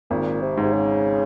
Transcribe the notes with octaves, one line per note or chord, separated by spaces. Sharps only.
G#1 A#2
C3
G#2
C3
C#3